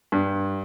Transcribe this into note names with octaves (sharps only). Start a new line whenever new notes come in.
G2